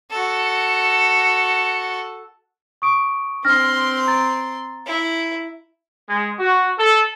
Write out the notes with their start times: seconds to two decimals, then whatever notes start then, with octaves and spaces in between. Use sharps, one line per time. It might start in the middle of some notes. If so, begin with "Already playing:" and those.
0.11 F#4 A4
2.82 C#6 D#6 D7
3.45 C4 D4 C6 F6 A#6
4.07 A#5 A6
4.87 E4
6.08 G#3
6.38 F#4
6.77 A4